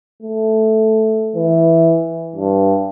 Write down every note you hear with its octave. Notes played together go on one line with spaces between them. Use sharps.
A3
E3
G2